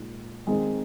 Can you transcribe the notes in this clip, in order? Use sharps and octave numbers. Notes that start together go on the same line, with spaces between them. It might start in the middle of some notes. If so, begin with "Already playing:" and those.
Already playing: A#2 G#3 D#4
D#3 G#3 C4 D#4 G#4